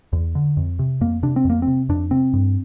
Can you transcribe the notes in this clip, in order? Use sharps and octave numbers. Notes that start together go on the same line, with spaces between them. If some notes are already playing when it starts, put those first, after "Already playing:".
E2
D3
F2
C3
F2 A#3
C3 D4
C4
F2 A#3
C4
C3
F2 D4
C3 C4
G2